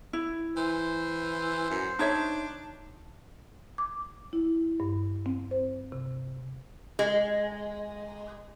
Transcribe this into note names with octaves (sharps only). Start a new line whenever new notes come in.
E4
E3 C5
F#2
D4 D#4 C#5 E5
D6
E4
G2
C4
C5
C3
G#3